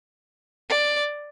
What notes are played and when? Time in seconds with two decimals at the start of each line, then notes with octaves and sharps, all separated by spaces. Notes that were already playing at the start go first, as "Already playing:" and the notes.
0.70 D5